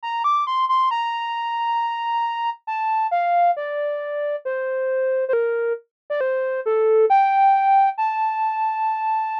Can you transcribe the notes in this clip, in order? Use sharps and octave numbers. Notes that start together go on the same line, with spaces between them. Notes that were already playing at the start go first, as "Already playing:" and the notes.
A#5
D6
C6
C6
A#5
A5
F5
D5
C5
C5
A#4
D5
C5
A4
G5
A5